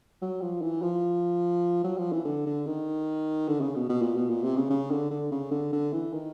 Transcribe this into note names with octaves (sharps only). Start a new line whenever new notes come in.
F#3
F3
E3
F3
F#3
F3
E3
D3
D3
D#3
D3
C#3
B2
B2
A#2
B2
A#2
C3
C#3
C#3
D3
D3
C#3
D3
D3
E3
D#3